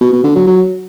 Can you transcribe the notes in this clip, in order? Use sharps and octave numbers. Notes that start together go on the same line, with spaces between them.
B2
B2
D3
F#3
F#3